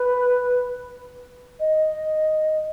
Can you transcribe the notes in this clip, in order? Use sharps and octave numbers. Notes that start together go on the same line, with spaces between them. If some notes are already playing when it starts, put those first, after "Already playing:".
Already playing: B4
D#5